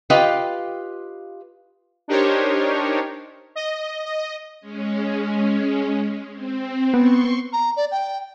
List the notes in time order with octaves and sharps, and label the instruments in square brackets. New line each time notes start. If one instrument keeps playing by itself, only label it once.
[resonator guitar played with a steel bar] F4 G4 B4 D#5 F5 G5
[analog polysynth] D4 D#4 G4 A#4 C5 C#5
D#5
D#5
[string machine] G#3 C#4
C4
[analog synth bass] B3 [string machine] C6 C#6
[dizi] A#5
D5
G5